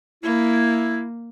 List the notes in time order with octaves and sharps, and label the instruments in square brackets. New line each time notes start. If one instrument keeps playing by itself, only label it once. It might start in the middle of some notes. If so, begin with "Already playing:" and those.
[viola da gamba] A#3 [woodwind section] E4